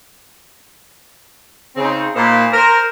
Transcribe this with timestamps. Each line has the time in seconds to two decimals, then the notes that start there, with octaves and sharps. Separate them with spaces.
1.76 C#3 C4 D#4
2.15 A#2 A#3 D#4 C5 A5 B5
2.53 A#4 C5